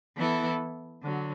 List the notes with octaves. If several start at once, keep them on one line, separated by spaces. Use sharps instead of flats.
E3 B3 E4 A4
D3 F#3